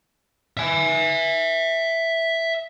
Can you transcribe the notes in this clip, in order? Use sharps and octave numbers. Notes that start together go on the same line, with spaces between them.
E5 G#5